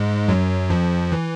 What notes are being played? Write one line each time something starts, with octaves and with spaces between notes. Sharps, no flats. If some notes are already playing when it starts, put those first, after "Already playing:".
Already playing: G#2 G#3
F#2 F#3
F2 F3
E3